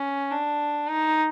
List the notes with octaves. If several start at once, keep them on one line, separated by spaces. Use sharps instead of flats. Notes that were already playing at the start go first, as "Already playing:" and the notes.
Already playing: C#4
D4
D#4